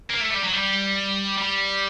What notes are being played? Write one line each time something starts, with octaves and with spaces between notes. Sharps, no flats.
A#3
A3
G3
F#3
G3
G3